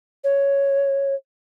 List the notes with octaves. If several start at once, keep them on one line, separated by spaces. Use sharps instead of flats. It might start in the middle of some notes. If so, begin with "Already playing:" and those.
C#5